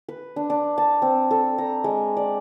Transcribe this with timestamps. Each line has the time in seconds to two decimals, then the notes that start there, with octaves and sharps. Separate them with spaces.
0.08 B4
0.36 D4
0.50 D4
0.78 A5
1.02 C4
1.31 A4
1.58 A#5
1.84 G#3
2.17 D5